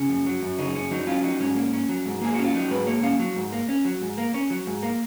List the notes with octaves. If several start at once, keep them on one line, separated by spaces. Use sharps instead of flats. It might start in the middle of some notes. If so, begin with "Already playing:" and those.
Already playing: C#3 C#4
F#2
F#3
F#2
C#3 D#4
F#2 C#4
F#3 D#4
C#4 F4
F#3 D#4
G#2 C#4
A#3
C#4
F#3
G#2
A#3 G#4
C#4 F#4
F4
F#3 D#4
G#2 B4
A#3 C#5
C#4 F5
F#3
G#2
A#3
C#4
F#3
G#2
A#3
C#4
F#3
G#2
A#3